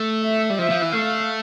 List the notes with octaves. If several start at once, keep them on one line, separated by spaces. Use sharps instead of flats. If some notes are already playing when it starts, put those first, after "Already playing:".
Already playing: A3
E5
G3
F3 E5
F3
E3
A3 F5